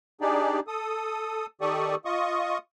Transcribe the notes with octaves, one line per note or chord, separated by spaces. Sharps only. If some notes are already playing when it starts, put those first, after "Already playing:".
D4 D#4 G4 G#4 D5
A4 D#6
D#3 G4 A4 D5 C#6 D#6
F4 D#5 C#6 D#6